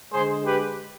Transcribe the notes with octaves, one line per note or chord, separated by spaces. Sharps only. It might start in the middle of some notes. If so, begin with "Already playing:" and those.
D3 G#3 G#4 C5
G4 B4